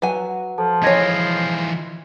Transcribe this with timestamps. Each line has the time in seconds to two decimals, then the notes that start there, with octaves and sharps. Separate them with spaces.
0.02 F#3 B4 F#5 G#5
0.58 F3 A4 A5
0.83 E3 F4 G#4 C#5 D#5 G#6 A#6